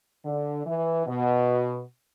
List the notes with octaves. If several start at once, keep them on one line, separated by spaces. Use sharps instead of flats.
D3
E3
B2